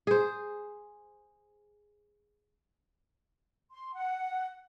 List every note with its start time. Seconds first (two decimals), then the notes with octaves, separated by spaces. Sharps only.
0.07 G#4 C5
3.71 C6
3.94 F#5